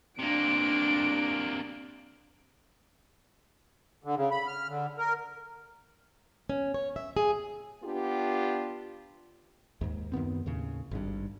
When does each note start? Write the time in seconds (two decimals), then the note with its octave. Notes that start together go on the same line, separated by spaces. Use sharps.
0.19 C3 A#3 D4 D7
4.04 D3
4.15 C#3
4.31 B5
4.47 F6
4.68 D3
4.98 A#4
6.49 C#4
6.74 C#5
6.96 E5
7.17 G#4
7.83 B3 D4 F4 G4
9.81 D#2 G#2
10.12 F#2 D#3 B3 C4
10.46 D#2 A2 C#3
10.91 G#1 G2